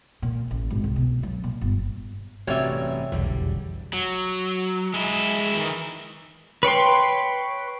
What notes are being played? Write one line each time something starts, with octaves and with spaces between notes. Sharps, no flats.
A#2
A1
G#1
C2
B2
F#3
A#2
G1
A1 G2 C3 F#4 G4 C#5 D5 E5
F1 B1 E2 D3 G3
F#3
G#3 E4
D#3 E3
B4 C#5 G5 C6